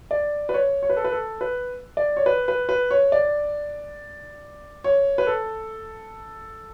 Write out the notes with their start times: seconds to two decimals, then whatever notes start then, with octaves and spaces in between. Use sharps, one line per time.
0.11 D5
0.49 B4
0.54 C#5
0.83 C#5
0.90 B4
0.97 A4
1.04 B4
1.12 A4
1.41 B4
1.97 D5
2.17 C#5
2.26 B4
2.48 B4
2.69 B4
2.91 C#5
3.12 D5
4.84 C#5
5.18 B4
5.27 A4